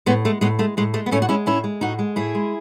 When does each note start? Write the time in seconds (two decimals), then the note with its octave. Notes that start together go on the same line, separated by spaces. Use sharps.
0.06 A2 G#3 B3
0.25 G#3 A3
0.41 A2 G#3 B3
0.59 G#3 A3
0.77 A2 G#3
0.94 G#3 A3
1.06 B3
1.11 A2 A3 C#4
1.22 F#4
1.29 G#3 C#4 E4
1.46 A2 C#4 E4
1.64 G#3
1.81 A2 D#4 F#4
1.99 G#3
2.16 A2 E4 G#4
2.35 G#3